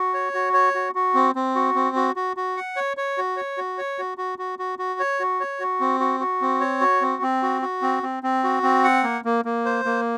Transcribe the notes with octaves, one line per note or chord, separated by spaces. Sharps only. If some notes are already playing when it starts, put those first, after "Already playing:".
Already playing: F#4
C#5
F#4
C#5
F#4
F#4
C4
C4
F#4
C4
F#4
F#4
F#4
F#5
C#5
C#5
F#4
C#5
F#4
C#5
F#4
F#4
F#4
F#4
F#4
C#5
F#4
C#5
F#4
C4
F#4
F#4
C4
C#5
F#4
C4
C4
F#4
F#4
C4
C4
C4
F#4
C4
F#5
A#3
A#3
A#3
C5
A#3